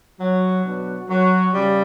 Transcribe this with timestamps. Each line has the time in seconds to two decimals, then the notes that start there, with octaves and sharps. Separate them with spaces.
0.19 F#3 F#4
0.64 B2 F#3 B3 D4
1.09 F#3 F#4
1.54 C#3 G3